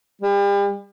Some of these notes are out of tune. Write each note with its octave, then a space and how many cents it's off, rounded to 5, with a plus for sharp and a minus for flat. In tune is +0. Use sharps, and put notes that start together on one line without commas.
G3 +40